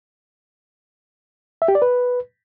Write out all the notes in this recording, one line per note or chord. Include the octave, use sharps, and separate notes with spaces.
E5
G4
D5
B4